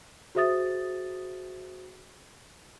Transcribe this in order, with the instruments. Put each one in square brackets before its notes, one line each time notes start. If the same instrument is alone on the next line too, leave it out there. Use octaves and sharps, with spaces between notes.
[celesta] F#4 G#4 C5 E5 D#6 A6